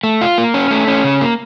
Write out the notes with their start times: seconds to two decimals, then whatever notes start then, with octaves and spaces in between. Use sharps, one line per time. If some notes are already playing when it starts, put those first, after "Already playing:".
0.04 A3
0.21 F4
0.38 A#3
0.54 C#4
0.71 A3
0.88 C#4
1.04 C#3
1.21 A#3